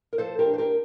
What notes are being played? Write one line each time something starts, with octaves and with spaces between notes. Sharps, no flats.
A#4
F3 A4 C5
G4 A#4
D4
C5
G4 A#4